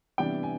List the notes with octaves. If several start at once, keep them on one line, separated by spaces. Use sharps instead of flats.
C3 E3 G3 B3 D4 G5
G#5